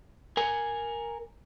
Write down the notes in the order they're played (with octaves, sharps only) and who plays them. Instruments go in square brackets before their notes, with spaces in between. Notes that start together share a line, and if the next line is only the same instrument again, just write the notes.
[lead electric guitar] A#4 G#5